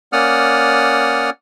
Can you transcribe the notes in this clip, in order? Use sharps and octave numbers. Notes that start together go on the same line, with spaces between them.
A#3 C#4 D5 F#5 D#6 F6